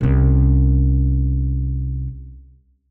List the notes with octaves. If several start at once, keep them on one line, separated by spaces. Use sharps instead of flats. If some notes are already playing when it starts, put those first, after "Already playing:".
C2 C#4